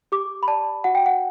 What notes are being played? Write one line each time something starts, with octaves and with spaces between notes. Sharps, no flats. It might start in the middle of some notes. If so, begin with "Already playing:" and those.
G4 D6
B5
D5 A5
F#4 F#5
G5
F#5